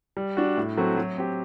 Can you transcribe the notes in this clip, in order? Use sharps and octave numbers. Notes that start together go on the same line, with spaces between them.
G3
D4 F#4
A2
F#3 A3 C4 F#4
F#3
C4 G4